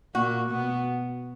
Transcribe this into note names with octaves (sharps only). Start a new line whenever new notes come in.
A#2 A#3 F#4
B2 B3